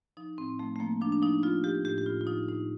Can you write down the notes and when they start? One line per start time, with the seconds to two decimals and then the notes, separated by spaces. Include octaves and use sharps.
0.17 F3 D#4
0.38 A2 C4
0.59 F3 A3
0.76 A3
0.80 F3 A#3
1.01 F3 D4
1.12 D4
1.22 F3 D#4
1.43 F3 F4
1.64 F3 G4
1.85 A2 G4
1.98 G4
2.06 A2 F4
2.21 F4
2.27 F3 D#4
2.48 A2 D#4